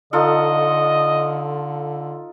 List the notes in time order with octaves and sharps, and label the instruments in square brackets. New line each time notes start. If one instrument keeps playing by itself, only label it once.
[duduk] D3 [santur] D#4 F4 A4 [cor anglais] D#5